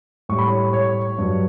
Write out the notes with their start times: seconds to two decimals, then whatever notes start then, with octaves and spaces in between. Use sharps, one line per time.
0.29 A2 G3 C#6
0.39 B5
0.48 C#5 C#6
0.73 C#5 C#6
1.18 G2 F#3